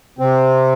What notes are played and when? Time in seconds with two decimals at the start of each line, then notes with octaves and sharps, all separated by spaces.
0.19 C3 C4